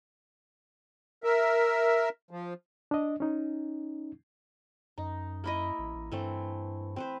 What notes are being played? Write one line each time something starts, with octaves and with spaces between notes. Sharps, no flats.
A#4 E5
F3
D4 D#5
C#4 D#4
F#2 D#4
A#3 E4 D#5
A1
A1
G2 E3 A3 C4
C4 B4 C5